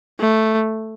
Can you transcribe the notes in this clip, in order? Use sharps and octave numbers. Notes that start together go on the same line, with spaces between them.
A3